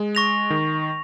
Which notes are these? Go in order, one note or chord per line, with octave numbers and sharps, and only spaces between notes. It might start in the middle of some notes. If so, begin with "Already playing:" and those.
Already playing: G#3
C#6 A#6 F7
D#3